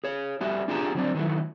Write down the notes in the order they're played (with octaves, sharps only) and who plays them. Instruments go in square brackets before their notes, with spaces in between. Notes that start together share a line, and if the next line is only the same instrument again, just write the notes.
[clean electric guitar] G#4 C#5
G3 A3 F#4 E5
D4 F4 G4 G#4 A5 A#5
D3 F#3 C4 D4
D#3 E3 F#3 A3